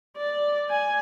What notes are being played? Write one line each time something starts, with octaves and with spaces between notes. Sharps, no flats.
D5
G#5